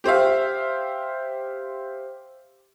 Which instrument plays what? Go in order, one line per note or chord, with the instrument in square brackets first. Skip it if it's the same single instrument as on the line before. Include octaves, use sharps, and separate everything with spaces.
[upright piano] G4 C5 E5 F5